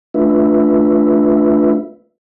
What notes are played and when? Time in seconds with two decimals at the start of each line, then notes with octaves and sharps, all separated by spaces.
0.14 A3 D4 F4 B4 E5